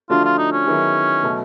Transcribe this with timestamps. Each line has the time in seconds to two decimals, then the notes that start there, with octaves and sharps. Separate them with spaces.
0.09 D3 F3 A3 D4 F4 F#4
0.24 F4
0.38 D#4
0.52 C#4
0.67 D#3 F#3 B3 E4 G#4
1.23 B2 F#3 A3